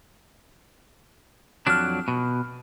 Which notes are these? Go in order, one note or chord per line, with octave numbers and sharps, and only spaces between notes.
F2 F#3 D4 F6 F#6
B2